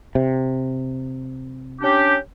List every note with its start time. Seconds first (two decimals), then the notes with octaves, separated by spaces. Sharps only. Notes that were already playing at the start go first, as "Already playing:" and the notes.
0.15 C3
1.82 C#4 D4 G4